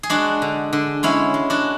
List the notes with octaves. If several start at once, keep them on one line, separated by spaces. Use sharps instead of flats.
G#4
G#3 D4 F#4
D3
D3
G#3 C#4 E4
G#3
D4 F#4